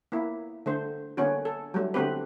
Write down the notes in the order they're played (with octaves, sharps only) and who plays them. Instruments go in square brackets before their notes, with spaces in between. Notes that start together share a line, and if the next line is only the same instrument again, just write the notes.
[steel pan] A#3 B3 E4
D3 A3 C5
D3 A#3 B3 C#4 F#4
A4
F#3 G3 A3
D3 A3 B3 C4 G4 B4